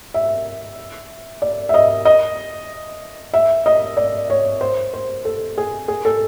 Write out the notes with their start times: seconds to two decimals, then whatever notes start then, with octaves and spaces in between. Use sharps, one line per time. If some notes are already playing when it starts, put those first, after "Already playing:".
0.14 E5
1.42 D5
1.69 E5
1.74 D#5
2.05 D#5
3.34 E5
3.66 D#5
3.97 D5
4.30 C#5
4.61 C5
4.94 C5
5.25 A4
5.58 G#4
5.88 G#4
6.05 A4